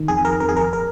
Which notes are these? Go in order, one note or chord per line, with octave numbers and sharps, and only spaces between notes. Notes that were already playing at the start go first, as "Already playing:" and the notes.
Already playing: D#3
F2 G#4
A#4
F2 A#4
G#4
A#4
A#4